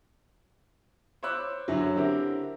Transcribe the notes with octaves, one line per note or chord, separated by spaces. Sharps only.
C5 C#5 B5 D6 E6 F#6
F#2 D3 F#3 E4
D3 C4 E4 G4 A#4